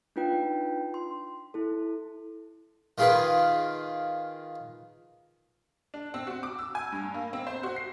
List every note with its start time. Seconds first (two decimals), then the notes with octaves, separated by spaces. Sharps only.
0.16 D4 D#4 F4 B4 G5
0.94 C6
1.54 E4 A4
2.98 D#3 F4 G#4 B4
5.94 D4
6.14 C4
6.27 F#4
6.43 D6
6.59 E6
6.75 G#5
6.92 G2
7.14 A#3
7.33 C4
7.47 C5
7.63 F#4
7.76 C7